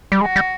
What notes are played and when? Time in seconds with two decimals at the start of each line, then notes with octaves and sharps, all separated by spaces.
0.12 G3
0.21 G#3 F#4
0.36 G3